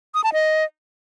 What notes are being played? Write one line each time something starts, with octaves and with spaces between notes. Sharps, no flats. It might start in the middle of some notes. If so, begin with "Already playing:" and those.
D#6
A5
D#5